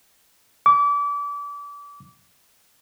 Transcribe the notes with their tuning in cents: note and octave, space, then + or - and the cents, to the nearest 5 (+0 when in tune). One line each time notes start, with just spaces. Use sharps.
D6 -30